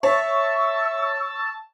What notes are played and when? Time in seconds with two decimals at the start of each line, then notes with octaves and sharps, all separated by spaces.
0.03 C#5 E5 A5 C#6 E6